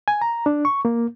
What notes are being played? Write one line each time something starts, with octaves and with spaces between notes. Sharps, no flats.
G#5
A#5
D4
C#6
A#3